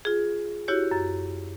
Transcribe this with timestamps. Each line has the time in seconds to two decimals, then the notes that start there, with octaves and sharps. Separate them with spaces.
0.05 F4 G#4
0.68 E4 F#4 G4 C#5
0.91 F#2